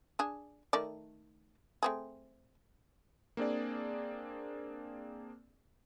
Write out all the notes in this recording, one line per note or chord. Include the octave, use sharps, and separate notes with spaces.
D4 G#4
D#3 A3 D5
A3 C4 G#4
A#3 C4 D4 G#4 D5